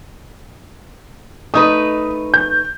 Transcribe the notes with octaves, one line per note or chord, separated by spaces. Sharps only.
A3 D#4 B4 D#6
G6